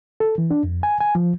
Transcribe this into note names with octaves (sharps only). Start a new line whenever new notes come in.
A4
E3
D4
F2
G#5
G#5
F3